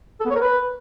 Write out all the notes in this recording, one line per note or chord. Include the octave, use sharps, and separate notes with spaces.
A4
B3
C#5
A#4
B4